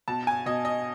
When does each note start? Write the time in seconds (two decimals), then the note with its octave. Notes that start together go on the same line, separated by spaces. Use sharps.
0.08 B2 A5
0.27 G#5
0.46 B2 D#5
0.65 D#5